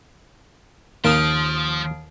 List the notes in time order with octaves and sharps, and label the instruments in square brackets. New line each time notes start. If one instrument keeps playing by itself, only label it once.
[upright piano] D#2 [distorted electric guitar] F3 [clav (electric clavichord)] A#3 [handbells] D#6 F6 D7